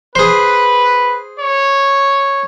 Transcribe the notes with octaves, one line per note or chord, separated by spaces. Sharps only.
G#4 B4 C5
C#5